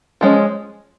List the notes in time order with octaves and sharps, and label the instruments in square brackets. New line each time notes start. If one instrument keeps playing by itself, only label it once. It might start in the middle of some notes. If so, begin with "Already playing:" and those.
[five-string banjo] F3 G#3 C#4